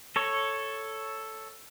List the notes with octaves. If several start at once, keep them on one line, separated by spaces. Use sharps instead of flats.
A4 C#5